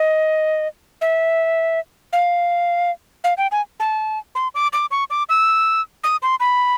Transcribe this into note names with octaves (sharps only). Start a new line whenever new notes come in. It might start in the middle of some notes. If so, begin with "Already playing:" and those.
Already playing: D#5
E5
F5
F5
G5
G#5
A5
C6
D6
D6
C#6
D6
E6
D#6
C6
B5